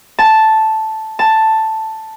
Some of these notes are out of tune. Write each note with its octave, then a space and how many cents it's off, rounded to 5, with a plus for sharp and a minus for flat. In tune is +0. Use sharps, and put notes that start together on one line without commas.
A5 -5
A5 +5